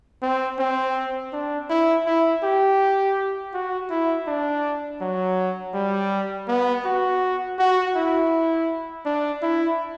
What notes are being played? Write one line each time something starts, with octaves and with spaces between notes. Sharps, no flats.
C4
C4
D4
E4
E4
G4
F#4
E4
D4
F#3
G3
B3
F#4
F#4
E4
D4
E4